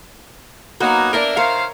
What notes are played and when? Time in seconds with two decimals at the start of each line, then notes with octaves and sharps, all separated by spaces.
0.80 F#3 A#3 B3 D#4 F#4
1.13 A#3 D4 A#4 D5 E5 A5
1.37 D#3 A#4 C5 C#5 F5